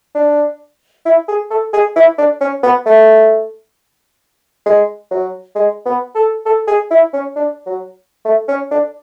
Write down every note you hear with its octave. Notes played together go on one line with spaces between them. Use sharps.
D4
E4
G#4
A4
G#4
E4
D4
C#4
B3
A3
G#3
F#3
G#3
B3
A4
A4
G#4
E4
C#4
D4
F#3
A3
C#4
D4